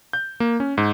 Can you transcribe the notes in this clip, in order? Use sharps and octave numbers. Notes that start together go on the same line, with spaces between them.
G6
A#3
C#4
G#2